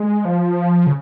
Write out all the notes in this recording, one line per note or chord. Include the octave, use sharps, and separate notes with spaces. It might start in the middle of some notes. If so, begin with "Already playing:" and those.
Already playing: G#3
F3
C#3